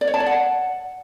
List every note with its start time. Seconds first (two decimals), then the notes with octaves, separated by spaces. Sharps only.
0.01 D5
0.07 C#5
0.14 A5
0.20 D5
0.26 F#5